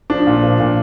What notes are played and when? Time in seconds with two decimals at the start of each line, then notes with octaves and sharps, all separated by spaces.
0.10 F3 D4
0.27 A#2
0.42 F3
0.60 A#2